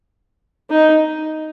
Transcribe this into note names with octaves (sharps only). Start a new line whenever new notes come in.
D#4